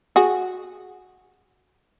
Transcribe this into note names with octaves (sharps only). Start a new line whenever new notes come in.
F#4 G#4